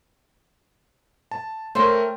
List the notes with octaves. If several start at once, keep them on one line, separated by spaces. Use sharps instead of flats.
A5
A3 A#4 C5 C#5 G5